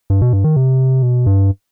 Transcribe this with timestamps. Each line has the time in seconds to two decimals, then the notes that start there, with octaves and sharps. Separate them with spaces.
0.10 G2
0.21 B2
0.33 G2
0.44 D#3
0.56 C3
1.03 B2
1.26 G2